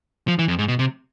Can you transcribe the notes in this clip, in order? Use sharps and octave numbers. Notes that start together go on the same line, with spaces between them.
F3
E3
F2
G#2
B2
C3